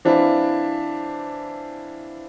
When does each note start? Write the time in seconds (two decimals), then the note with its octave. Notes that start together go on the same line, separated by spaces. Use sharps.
0.05 E3 C4 D4 E4 F4